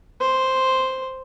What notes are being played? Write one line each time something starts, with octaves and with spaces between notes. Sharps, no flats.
C5